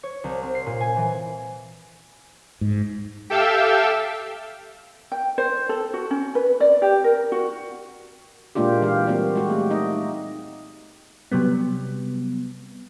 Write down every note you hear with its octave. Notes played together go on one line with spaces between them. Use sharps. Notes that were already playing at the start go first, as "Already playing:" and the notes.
C#5
C2
C4
C7
A#2
G#5
E3
G#2
G4 A4 E5 F5 G5 E6
G5
C5
A4
F#4
C#4
B4
D5
G4
A#4
F#4
A#2 G#3 A#3 D4 F4 G4
E3 G4 F5
G3 A#3 C4 F#4
G#3 F#4 G4
A3 G4
D#4 D#5
C3 F#3 G3 B3